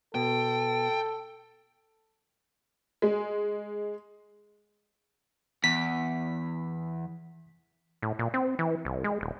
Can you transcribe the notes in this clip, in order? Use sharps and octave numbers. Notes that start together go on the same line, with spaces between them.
B2 A4 G5
G#3
E2 B6
A2
A#2
C4
E3
C2
G#3
D#1